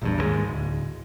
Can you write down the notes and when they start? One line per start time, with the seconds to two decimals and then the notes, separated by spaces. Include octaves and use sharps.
0.02 A#1 E2 G2
0.18 D#2 G#2 G#3
0.48 D1